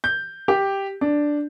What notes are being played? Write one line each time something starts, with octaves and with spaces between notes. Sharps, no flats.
G6
G4
D4